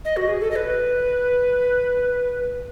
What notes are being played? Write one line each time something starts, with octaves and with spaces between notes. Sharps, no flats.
D#5
F#4
G#4
A4
D#5
B4